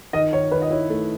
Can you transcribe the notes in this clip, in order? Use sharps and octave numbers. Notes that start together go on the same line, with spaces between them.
D#3 D#5
D#3 C#5
D#3 B4
D#5
E4 C#5
A3